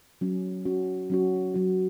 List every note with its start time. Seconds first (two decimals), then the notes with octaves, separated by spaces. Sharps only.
0.21 F#3 C#4 F#4
0.65 F#3 C#4 F#4
1.10 F#3 C#4 F#4
1.54 F#3 C#4 F#4